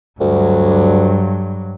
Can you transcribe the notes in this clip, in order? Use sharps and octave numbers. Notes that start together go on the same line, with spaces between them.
D2 G2 F#3